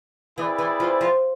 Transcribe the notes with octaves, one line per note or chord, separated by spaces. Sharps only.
E3 C4 E4 G#4 B4 D5
E3
F3
F3